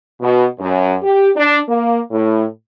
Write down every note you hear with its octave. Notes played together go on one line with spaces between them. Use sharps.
B2
F#2
G4
D4
A#3
A2